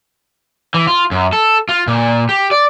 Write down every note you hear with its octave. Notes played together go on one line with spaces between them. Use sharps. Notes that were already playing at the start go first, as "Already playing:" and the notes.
E3
F4
F#2
A4
F4
A#2
G4
D5